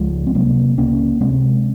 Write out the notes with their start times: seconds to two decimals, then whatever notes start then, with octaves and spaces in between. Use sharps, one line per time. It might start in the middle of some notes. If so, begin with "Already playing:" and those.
Already playing: C#2 F3 G#3
0.27 C4
0.34 C3 F#3 A#3
0.78 C#2 A#3 C#4
1.20 C3 G#3 C4